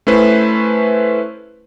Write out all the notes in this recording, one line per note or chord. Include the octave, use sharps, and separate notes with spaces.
A3 C#4 E4 B4 C5